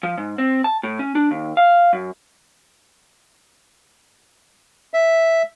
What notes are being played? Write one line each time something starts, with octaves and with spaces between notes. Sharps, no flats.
F3
G#2
C4
A5
A2
C#4
D4
D#2
F5
F#2
E5